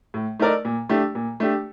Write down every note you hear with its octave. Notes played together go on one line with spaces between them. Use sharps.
A2
A3 D#4 A#4 D5
A#2
A3 D4 G4
A#2
A3 D4 G4